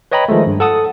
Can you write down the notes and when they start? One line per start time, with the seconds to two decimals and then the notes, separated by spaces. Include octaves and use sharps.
0.12 B4 C#5 D#5 G5 A#5 B5
0.28 D#3 F3 G#3 A3
0.47 G2
0.60 A4 F#5 A5 D#6